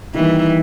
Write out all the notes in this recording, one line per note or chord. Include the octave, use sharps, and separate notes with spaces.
D#3 E3 G3 A#3